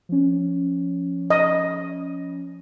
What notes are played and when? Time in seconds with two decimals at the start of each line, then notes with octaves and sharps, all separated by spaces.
0.09 F3 C#4
1.30 D#5